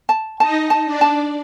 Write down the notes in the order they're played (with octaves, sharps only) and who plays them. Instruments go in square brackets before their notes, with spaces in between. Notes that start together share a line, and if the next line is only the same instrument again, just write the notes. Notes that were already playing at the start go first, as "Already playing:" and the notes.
[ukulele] A5
[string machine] D#4 D#5 [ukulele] A5
[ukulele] A5
[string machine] D4 D5
[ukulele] A5